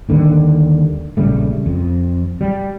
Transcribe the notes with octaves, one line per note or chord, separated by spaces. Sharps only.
D#2 D3 D#3 G3
A#1 C#3 G3 A3
F2
G3